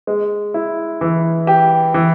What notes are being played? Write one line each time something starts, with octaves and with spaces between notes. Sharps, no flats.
G#3
E4
E3
G4
E3